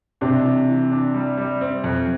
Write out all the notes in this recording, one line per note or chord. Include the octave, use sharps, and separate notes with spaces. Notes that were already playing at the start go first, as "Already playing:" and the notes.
C3 D4
E3
E3
D4
G3
G3
C4
F2